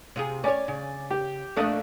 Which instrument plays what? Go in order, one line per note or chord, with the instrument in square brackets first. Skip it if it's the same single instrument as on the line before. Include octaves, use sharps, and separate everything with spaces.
[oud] C3 F4 G#4
[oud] C#4 C#5 [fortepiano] D5 G#5 D6
[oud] C#3
[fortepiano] G4
[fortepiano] A#1 A3 D#6 [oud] D4 A4 D#5